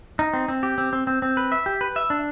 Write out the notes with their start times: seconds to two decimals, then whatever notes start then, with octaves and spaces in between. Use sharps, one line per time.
0.19 D#4
0.34 C4
0.48 C4
0.63 G4
0.78 C4
0.93 C4
1.07 C4
1.22 C4
1.37 B4
1.52 E5
1.66 G4
1.81 B4
1.96 E5
2.10 D4